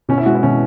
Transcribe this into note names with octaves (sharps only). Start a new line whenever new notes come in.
B2 C#4
E4
G#3 F#4
E4
B2 C#4